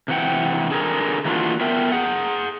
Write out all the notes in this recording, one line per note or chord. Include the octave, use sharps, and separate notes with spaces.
C3 E3 F#5 G5
D3 G#4 A#4
E3 F#3 A#3 D4 F4 F#4
B3 A#4 E5 G5
G#4 F#5